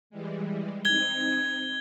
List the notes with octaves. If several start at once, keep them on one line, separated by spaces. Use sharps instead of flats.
E3 G3 G#3
C4 D#4 G#6 G7